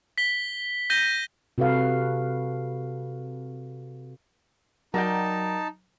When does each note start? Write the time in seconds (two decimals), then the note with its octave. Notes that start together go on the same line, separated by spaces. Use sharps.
0.18 B6 G7
0.90 G6 A#6 D#7 G7
1.58 C3 F#4 A4 B4 F5
4.94 F#3 D#4 A#4 D5 G5 A5